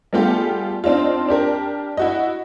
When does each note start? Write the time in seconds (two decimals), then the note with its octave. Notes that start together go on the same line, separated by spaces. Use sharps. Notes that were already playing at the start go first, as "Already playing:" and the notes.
0.13 G3 A3 B3 F4 G4 G#4
0.84 C4 D4 D#4 F4
1.29 D4 G4 A#4
1.97 E4 F#4 D#5